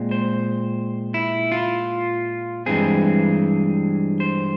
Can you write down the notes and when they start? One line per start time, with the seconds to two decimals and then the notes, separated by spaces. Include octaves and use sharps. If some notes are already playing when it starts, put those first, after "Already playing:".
Already playing: A#2 G#3 C4
0.11 C5
1.14 E4
1.52 F4
2.66 G2 E3 G#3 C4 G#4
4.20 C5